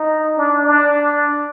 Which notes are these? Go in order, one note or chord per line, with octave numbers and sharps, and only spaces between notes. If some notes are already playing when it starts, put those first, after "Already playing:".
Already playing: D#4
D4
D4